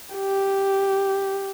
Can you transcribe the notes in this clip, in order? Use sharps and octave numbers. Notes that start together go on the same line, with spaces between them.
G4